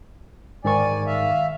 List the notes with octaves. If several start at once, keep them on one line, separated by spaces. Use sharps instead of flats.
G#2 D#3 D5 G#5 C#6
E5 F5